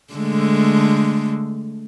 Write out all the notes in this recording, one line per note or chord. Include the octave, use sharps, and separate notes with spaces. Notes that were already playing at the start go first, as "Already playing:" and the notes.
D3 G#3 A3